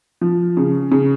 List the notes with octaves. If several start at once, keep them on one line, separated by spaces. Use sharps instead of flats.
F3
C#3
C#3